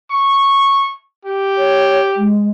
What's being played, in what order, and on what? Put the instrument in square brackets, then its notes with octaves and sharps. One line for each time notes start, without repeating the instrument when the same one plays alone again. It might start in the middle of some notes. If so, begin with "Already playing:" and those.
[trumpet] C#6
G4
[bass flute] C#5
G#3